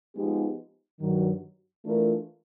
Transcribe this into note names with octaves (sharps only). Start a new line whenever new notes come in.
F3 G#3 B3 D#4 G4
G2 D#3 F#3
E3 A3 D4 F4 A#4